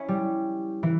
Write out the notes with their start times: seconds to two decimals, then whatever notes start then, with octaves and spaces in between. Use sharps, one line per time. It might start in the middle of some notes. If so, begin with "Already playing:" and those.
Already playing: C#4 E4
0.08 G3
0.83 E3